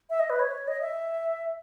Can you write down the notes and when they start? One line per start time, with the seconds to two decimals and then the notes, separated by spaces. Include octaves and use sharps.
0.10 E5
0.19 D#5
0.30 B4
0.39 C#5
0.68 D#5
0.81 E5